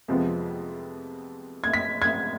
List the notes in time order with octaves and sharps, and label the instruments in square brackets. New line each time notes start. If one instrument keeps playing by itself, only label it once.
[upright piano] F2 C3 F3 G#3 B3
G#6
B6
G#6